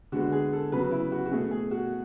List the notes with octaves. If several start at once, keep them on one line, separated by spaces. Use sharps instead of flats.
D3 G#3 B3 F#4
G#4
A4
C#3 F#3 B3 B4
E4
F#4
F#4
B2 A3 G#4
G#4
F#4